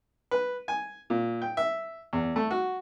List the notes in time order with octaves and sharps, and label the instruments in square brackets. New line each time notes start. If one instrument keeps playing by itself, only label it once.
[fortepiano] B4
G#5
A#2
G5
E5
E2
A3
F#4